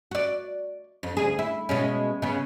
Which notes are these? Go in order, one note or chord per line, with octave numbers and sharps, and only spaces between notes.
F#4 D5
F2
D2 G#4
E4
B2 G#3 C#4
C#3 B3